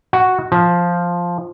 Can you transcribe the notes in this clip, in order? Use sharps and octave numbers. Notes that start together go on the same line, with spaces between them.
F#4
F3